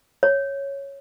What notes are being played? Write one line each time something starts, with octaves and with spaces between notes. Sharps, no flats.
C#5